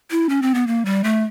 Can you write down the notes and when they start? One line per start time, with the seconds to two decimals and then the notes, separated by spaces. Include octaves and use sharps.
0.11 E4
0.29 C#4
0.42 C4
0.54 B3
0.67 A#3
0.85 G3
1.04 A3